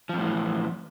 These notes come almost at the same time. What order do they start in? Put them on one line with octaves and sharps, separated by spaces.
F3 F2 A2 E3